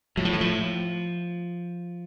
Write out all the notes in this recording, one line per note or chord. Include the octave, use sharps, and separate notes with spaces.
A2 F#3
F3
E3
F3